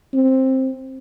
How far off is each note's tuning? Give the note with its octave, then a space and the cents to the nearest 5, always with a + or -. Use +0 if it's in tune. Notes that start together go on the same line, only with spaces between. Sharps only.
C4 +10